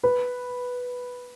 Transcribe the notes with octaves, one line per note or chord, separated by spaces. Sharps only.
B4